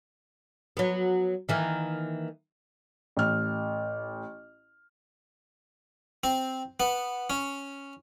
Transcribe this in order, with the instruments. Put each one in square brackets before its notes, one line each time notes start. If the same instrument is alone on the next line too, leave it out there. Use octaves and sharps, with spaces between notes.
[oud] F#3 B3
D#3 E3 A#3
[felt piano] A1 F6
[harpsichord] C4
B3
C#4